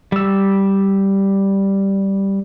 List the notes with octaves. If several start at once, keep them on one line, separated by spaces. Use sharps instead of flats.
G3 E6